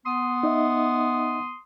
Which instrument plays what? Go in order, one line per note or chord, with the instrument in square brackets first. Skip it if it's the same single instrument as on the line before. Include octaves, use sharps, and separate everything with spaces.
[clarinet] B3 [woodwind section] C6 D#6
[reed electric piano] D#4 D#5 E5